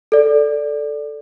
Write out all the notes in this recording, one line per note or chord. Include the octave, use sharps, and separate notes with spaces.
A4 D5